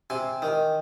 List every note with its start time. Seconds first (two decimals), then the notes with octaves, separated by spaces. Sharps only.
0.10 C3 G#5
0.42 D#3